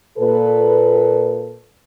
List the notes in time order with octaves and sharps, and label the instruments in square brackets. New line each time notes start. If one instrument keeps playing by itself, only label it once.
[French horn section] A#2 A4 B4